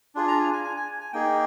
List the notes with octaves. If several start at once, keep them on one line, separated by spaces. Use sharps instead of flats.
D4 F4 G#4
A#5
G#5
G#5
G#5
G#5
G#5
A#3 D#4 G#4 G5